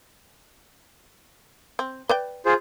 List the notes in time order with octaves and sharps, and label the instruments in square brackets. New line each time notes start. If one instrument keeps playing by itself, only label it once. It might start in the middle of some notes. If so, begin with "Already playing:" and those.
[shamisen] C4
B4 D5 G5
[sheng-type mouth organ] F4 G#4 C5